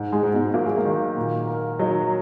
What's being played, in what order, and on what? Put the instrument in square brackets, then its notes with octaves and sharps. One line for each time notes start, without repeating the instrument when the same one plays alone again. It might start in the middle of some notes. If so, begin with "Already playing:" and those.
Already playing: [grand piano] G#2
[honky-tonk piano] G#3
[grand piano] G#2
[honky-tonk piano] B2
[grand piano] F#3 [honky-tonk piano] A#3
[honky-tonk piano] G#3
A#3
[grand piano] D#3
A#2
A#4
[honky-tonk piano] F#3 [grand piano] D#4